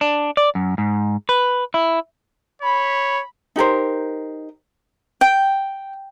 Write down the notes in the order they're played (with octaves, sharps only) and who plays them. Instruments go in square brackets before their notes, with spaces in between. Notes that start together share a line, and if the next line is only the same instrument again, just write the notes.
[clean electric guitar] D4
D5
F#2
G#2
B4
E4
[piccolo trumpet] C#5 [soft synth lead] B5
[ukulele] D#4 G4 A#4 C5
[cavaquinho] G5